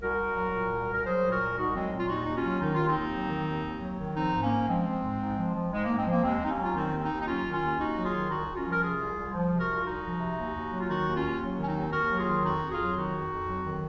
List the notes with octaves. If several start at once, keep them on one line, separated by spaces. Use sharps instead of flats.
C2 F#4 A#4
C2
F#3
A#2
C2
C2 A#4
F#3 G#4 C5
A#2
F#4 A#4
C2
C2 D#4 F#4
F#3 G#3 C4
A#2
F4
D#2 D#4 F#4
D#2 D#4
C#4 F4
F#3
D#3 D#4
D#2 F4
C4 D#4
D#2
F#3
D#3
D#2
D#2
F#3
D#3
F3 C4 D#4
G#2
A#3 C#4
G#2
F3 G#3 C4
F3
G#2
G#2
F3
F3
G#2 G#3
G#2 A#3
G#3 C4
F3 A#3
D#2 G#3 C4
D#2 D#4
A#3 C#4
F#3
F4
D#3 C4 D#4
D#2
C4 D#4
D#2
D#4
F#3 C#4 F4
D#3
C#4 F4
D#2
D#2 D#4 F#4
F#3
F4 G#4
D#3
C2 D#4 F#4
C2
C#4 F4
F3
A#4
C3 F4 G#4
C2
C2
F3
C3
F#4 A#4
C2
F4
C2 D#4 F#4
F3
C3
D#2
D#2
F#3
F4
D#3 D#4 F#4
D#2
C#4 F4
D#2
F#3
D#3 C#4
C4 D#4
D#2
D#2 F#4 A#4
F#3
F4 G#4
D#3
F2 D#4 F#4
F2
F4 G#4
F#3
D#3 D#4 F#4
F2
F2
F#3
D#3